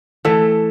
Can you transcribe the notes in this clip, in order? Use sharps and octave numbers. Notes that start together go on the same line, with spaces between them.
E3 A3 A4